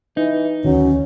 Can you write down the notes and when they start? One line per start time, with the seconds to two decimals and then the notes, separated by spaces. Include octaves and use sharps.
0.17 E3 D#4
0.65 D2 D3 D#3 F#3 C#4